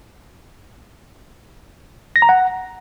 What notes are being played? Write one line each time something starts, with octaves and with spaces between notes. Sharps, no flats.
A#6
A#5
F#5